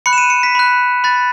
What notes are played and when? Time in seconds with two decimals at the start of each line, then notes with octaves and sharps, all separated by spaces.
0.06 B5 F#6 C#7
0.13 E7
0.18 D#7
0.30 C#7
0.43 B6
0.55 B5 F#6
1.04 B5 F#6 A6